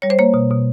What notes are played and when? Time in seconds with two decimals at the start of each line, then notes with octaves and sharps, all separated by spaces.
0.02 G3 C#5
0.10 C5
0.19 A#3 C#5
0.34 B2
0.50 B2